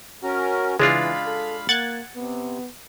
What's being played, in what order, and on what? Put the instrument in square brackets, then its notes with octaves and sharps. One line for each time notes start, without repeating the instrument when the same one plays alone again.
[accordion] C#4 A#4 [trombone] F#4
[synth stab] C#3 [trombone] E3 [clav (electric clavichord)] G#3 D4 F4 [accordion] F5 B5
[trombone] A4
[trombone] A#3 [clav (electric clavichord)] F#5 [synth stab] F#6 G#6 A6
[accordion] C3 [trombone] B3